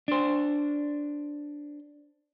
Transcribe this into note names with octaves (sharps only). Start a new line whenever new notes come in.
D4 C5